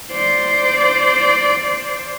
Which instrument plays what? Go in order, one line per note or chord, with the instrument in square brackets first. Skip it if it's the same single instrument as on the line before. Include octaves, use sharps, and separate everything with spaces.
[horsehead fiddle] C5 D5